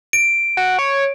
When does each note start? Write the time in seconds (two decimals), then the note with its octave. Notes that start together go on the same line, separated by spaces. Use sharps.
0.13 D7
0.57 F#4
0.79 C#5